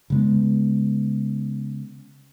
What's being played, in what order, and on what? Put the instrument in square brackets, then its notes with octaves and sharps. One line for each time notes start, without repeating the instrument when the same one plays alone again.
[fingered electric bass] C#3 G#3 B3